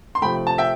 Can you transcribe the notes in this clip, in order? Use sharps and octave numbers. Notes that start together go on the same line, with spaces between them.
C6
C3 F3 A3 G5 B5
A5
E5 G5